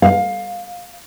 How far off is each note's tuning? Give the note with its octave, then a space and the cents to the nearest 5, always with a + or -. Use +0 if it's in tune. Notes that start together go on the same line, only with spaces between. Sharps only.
F5 +20